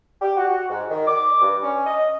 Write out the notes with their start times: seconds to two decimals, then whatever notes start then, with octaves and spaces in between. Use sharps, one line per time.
0.20 G4
0.36 F#4
0.69 G#2
0.90 D#3
1.06 D6
1.41 G2
1.62 C#4
1.85 D#5